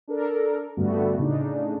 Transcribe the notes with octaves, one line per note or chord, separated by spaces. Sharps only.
D4 A4 A#4
G2 D3 G3 A3 B3 F#4
A2 C#3 D4 D#4